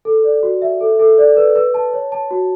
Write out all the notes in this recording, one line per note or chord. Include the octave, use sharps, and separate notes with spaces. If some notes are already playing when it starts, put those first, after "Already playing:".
A4
D5
F#4
E5
A4
A4
D5
B4
B4
A5
C#5
A5
F#4